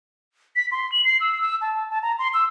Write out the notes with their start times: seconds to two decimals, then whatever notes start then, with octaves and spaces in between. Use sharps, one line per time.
0.56 B6
0.72 C6
0.92 F#7
1.05 C7
1.21 E6
1.41 E6
1.62 A5
1.90 A5
2.03 A#5
2.19 C6
2.34 E6